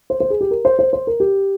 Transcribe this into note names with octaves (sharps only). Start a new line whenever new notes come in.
C5
C5
G#4
G4
A#4
C5
C5
C5
A#4
G4